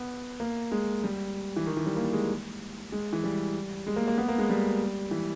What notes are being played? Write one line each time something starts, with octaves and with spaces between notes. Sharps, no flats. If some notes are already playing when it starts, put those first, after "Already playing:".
Already playing: B3
A#3
G#3
G3
E3
D#3
E3
G3
A#3
G#3
G#3
E3
G3
G#3
A#3
A#3
B3
A#3
G#3
G3
E3